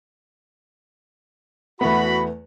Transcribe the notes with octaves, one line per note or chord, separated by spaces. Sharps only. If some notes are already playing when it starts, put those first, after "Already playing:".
E2 A3 B3 F#4 B5